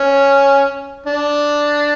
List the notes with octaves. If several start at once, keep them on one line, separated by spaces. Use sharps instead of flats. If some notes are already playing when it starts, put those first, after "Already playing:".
Already playing: C#4
D4